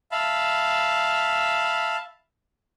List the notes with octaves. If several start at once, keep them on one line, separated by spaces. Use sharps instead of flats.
E5 F5 A5 B5